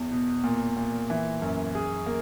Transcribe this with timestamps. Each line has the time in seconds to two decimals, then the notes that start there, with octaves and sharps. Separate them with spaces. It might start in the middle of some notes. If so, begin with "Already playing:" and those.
Already playing: E2
0.12 B2
0.44 A#2
0.76 A#2
1.10 E3
1.42 F#2
1.75 G#4
2.06 A#3